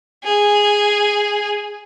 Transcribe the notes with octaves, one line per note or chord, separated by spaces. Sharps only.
G#4